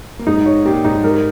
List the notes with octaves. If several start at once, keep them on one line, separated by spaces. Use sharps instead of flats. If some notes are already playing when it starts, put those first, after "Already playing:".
A#3
G#2 G#3 D#4
C#5
A#2 A#3 G4
G#2 G#3 D#4
G#2 G#3 A#4